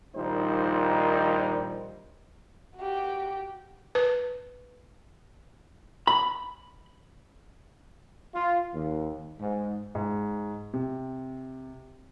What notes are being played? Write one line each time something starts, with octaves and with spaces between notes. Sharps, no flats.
A#1 A#2 D#3 G3 D#4 C5
F#4 G4
B4
B5
F4
D#2
G#2
G#2
C3